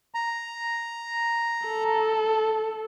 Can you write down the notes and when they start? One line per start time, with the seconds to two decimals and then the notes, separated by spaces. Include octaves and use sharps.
0.15 A#5
1.67 A4